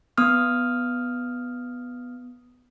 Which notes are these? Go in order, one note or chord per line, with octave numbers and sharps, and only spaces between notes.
B3 D#6 F6